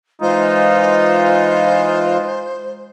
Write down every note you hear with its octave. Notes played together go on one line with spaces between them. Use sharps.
E3 G#3 D#4 F4 C5